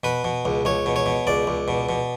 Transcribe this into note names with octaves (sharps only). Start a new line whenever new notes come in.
B2 B4
B2
C#2
C#2 C#5
B2
C#5
B2
C#2 D5
C#2
B2
B2